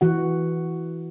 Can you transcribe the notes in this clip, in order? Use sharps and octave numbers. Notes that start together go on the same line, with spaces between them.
E3 F#4 F#5